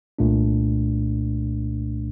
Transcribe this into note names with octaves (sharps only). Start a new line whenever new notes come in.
C2 A#2 A3 D4